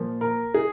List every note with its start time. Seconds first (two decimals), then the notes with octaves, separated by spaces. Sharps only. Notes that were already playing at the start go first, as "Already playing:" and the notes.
Already playing: A#2 F3
0.21 A#4
0.54 G#4